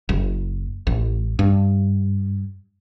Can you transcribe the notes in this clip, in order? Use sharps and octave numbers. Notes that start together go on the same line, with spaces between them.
F#1
A1
G2